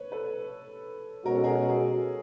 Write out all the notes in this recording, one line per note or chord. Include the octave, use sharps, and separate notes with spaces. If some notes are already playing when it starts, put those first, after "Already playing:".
Already playing: B4 C#5
A4 B4
B2 G#3 C#4 F#4 A#4
A4
G#4 A#4
G#4 A#4